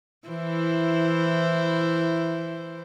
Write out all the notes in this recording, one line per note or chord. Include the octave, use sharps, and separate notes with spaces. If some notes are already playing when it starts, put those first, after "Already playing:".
E3 E4 C5